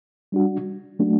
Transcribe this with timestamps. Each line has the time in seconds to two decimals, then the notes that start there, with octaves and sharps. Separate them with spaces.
0.32 G3 D4 F#4
0.99 F#3 A3 D4 F#4